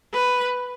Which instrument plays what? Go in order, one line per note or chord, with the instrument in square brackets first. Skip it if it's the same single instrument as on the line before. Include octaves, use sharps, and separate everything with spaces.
[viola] B4